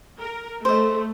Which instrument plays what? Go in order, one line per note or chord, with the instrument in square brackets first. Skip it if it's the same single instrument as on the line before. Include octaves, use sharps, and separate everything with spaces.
[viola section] A#4
[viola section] A3 [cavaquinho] C5 D#5